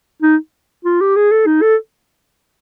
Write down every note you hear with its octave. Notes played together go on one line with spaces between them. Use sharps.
D#4
F4
G4
G#4
A4
D#4
A4